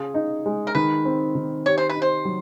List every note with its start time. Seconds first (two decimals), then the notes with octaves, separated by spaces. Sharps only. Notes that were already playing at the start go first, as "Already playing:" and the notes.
Already playing: C#3 F4 G#4
0.14 D#4
0.46 G#3
0.67 A#4
0.75 D#3 B4
1.05 C4
1.35 D#3
1.66 G4 C#5
1.78 C5
1.89 B4
1.95 D#4
2.02 C5
2.25 F#3